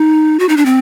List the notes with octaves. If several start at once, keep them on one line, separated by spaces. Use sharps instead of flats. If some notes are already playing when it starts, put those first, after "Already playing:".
Already playing: D#4
F#4
D#4
D4
C4